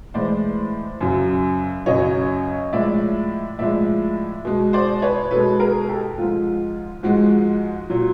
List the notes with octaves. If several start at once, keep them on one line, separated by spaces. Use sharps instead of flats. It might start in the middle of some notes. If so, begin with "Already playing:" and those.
A2 E3 G#3 C5 D5
F#2 C#3 F#3
F#2 C#3 F#3 C#5 D#5
A2 F3 G#3 D5 E5
A2 F3 G#3 D5 E5
B2 G#3
C5 D5
B4 C#5
B2 G#3 A4 B4
G#4 A#4
G4 A4
G#2 F3 G#3 F4
G#2 F3 G#3 F#4
A#2 F#3